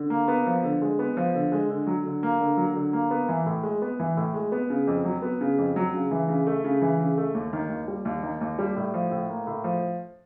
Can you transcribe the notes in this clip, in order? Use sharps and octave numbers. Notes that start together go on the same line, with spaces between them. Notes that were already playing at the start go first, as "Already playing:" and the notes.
Already playing: D3
A#3
B3
F3
D3
G#3
B3
F3
D3
G#3
D3
F#3
D3
A#3
D3
F#3
D3
A#3
B3
E3
A2
G#3
B3
E3
A2
G#3
B3
C#3
F2
F#3
B3
C#3
F2
F#3
C#3
E3
C#3
A3
C#3
E3
C#3
A3
D#2
D#3
D#2
G3
D#2
D#3
D#2
G3
A2
F3
A2
A#3
A2
F3